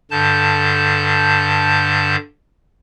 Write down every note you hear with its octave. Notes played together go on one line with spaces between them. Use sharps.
G2 D3 A5 G6